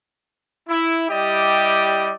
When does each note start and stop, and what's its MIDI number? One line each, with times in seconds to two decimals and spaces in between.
0.69 1.06 64
1.10 2.14 55
1.10 2.14 64
1.10 2.14 67
1.10 2.14 74
1.10 2.14 75